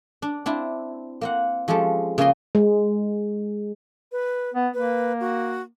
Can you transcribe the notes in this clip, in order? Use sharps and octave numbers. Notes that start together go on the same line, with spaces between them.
D4
C4 D4 E4
A#3 C4 F#5
F3 G#3 C#4 G4 A4
C#3 A#3 F4 G#4 D#5 C6
G#3
B4
B3
A#3 B4
F#4